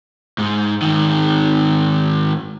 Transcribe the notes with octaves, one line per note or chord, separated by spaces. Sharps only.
G#2
G#2 D#3